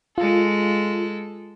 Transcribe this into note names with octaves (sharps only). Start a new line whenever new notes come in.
G#3 F4 A4